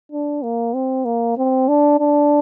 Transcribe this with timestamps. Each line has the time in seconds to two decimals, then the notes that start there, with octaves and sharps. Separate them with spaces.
0.12 D4
0.43 A#3
0.74 C4
1.05 A#3
1.38 C4
1.68 D4
2.00 D4